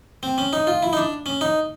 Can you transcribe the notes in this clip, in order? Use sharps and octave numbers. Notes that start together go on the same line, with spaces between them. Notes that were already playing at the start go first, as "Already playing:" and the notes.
C4
C#4
D#4
F4
E4
D#4
D4
C#4
D#4